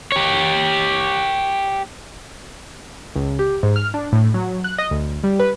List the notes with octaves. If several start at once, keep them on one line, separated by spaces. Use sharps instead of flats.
G4 C#5
C#2
G4
G#2
F6
D4
A2
F#3
F#6
D#5
D2
G3
B4